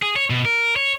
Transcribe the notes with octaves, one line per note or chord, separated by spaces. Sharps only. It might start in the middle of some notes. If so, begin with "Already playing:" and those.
G#4
C#5
B2
A#4
C#5